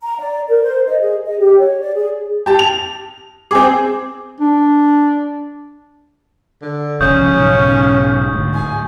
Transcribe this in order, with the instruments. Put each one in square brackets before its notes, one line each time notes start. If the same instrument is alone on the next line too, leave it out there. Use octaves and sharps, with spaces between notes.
[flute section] A#5
D5
A#4
C5
D#5
G#4
D#5
G4
C#5
D5
G#4
[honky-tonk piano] G4 A5
F7
[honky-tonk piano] C4 G#4 [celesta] G#5 D6
[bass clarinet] D4
[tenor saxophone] D3
[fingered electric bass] G1 C2 F3 [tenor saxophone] C#3 [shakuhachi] C#4 [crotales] C#6 D#6 G6
[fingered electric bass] B1 G#2
D2 G#2
[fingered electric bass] D1 [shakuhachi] G#5